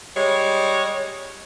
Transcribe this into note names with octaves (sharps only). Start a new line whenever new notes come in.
G3 G#3 C#5